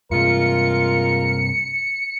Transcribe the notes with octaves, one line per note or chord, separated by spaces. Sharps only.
G2 C3 G#3 F4 A#4 C#7